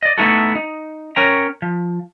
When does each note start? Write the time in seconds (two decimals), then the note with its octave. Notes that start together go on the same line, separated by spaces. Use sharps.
0.03 D5 D#5
0.18 A3 B3 D#4 E4 F#4 A4
0.55 D#4
1.16 C#4 A#4 C#5 G5 A#5
1.62 F3